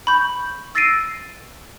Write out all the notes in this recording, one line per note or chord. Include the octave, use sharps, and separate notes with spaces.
B5 C#6 G6
E6 A6 A#6 C7 D7 D#7